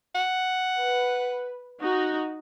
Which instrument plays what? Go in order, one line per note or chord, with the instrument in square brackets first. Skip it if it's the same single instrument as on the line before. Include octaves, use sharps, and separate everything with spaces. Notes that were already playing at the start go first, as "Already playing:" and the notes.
[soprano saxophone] F#5
[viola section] B4
D#4 F#4